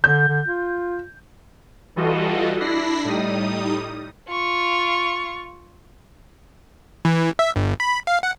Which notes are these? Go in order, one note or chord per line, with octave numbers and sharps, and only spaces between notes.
D3 G6
D3
F4
E3 G3 F4 F#4 A4 D#5
D4 E4 B5 A#6 C7
A2 G3 D#4 D#6
F4 C#6
E3
E5
G1
B5
F5
F#5